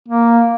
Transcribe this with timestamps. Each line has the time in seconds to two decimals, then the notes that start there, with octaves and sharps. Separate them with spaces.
0.08 A#3